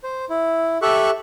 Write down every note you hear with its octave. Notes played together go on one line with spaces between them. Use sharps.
C5
E4
G4 A4 E5 C#6 F#6